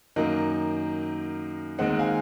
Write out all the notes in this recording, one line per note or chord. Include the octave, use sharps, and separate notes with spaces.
F#2 D#3 A#3 D#5
D#2 D#3 G#3 C4 D#5 F#5
F5 G#5